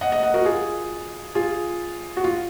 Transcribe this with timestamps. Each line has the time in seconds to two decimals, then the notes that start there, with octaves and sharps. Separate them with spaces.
0.01 D#5 F#5
0.12 D#5 F#5
0.23 D#5 F#5
0.34 F#4 A#4
0.45 F4 G#4
1.35 F4 G#4
2.17 F#4
2.24 F4